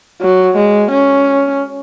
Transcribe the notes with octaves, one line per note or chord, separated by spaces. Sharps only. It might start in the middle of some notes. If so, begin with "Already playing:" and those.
F#3
G#3
C#4